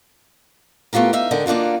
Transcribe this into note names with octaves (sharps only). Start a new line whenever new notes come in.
A3 B3 F4 G4 A#4
D#4 E5 F5
G#2 D3 A#4 D#5 G5
A#3 D4 D#4 F4 F#4